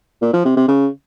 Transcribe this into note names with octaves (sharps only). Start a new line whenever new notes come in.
A#2
F3
C3
C3
C#3